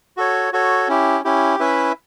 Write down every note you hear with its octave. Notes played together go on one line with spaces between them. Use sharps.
F#4 A4 C#5
F#4 A4 C#5
C#4 E4 G4
C#4 E4 G4
C#4 E4 B4 E5